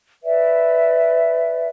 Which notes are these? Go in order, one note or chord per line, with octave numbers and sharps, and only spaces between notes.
B4 D5 E5